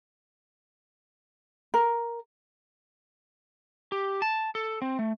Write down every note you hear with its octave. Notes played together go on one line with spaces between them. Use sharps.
A#4
G4
A5
A4
C4
A3